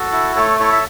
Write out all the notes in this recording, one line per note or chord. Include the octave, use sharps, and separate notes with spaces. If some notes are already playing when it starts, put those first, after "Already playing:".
Already playing: F#4 A4
E4
A3 A4 C#5
E4 A4 C#5
E5